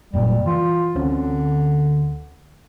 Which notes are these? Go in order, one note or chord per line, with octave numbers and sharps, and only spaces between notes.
F#1 F#2 A#2 G3
E3 F4
D2 D3 C4 C#4